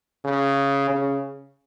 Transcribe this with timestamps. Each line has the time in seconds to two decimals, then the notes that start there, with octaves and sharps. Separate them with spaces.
0.24 C#3
0.89 C#3